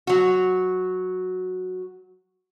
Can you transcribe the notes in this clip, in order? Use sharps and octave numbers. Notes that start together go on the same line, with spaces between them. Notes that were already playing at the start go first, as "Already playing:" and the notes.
F#3 F#4